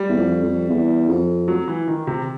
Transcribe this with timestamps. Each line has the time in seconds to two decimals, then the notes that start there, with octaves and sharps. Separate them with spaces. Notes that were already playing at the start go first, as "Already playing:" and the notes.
Already playing: G3
0.09 E2
0.17 F2
0.43 F2
0.69 E2
1.08 F2
1.48 F#3
1.68 E3
1.88 D#3
2.07 C3